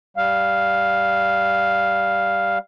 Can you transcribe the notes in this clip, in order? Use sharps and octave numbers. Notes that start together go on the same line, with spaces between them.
G3 F5